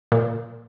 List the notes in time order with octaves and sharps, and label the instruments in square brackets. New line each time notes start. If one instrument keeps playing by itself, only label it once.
[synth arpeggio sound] A#2